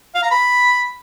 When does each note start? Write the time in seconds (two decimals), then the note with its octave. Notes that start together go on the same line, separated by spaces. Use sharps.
0.15 F5
0.23 A#5
0.31 B5